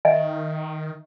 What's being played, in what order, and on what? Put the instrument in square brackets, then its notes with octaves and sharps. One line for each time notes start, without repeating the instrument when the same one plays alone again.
[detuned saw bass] D#3 [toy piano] D#5 E5 G#5